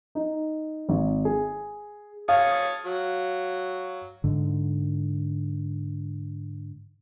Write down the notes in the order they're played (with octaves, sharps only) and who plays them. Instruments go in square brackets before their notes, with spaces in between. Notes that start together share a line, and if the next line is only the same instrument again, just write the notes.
[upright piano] D#4
G#1
G#4
[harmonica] C#5 A5 D#6 [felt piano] F5
[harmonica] F#3
[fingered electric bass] G#2 D3